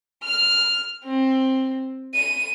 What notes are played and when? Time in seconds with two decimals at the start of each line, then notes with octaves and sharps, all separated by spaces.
0.24 F6
1.05 C4
2.14 D#7